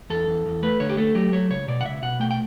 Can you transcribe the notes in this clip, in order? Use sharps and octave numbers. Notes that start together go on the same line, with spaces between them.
E2 A4
E2
E2
A3 B4
D3 C#5
G4
A3 A4
F#3 G4
A3 C#5
C#2 C#5
B2 D5
F#5
C#2 E5
B2 F#5
A3 G5
G5